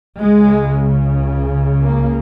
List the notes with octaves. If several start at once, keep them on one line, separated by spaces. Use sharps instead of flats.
C#2 C#3 G#3
A#3